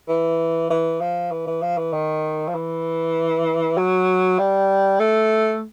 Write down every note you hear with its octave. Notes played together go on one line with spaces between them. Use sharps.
E3
E3
F3
E3
E3
F3
E3
D#3
F3
E3
F#3
G3
A3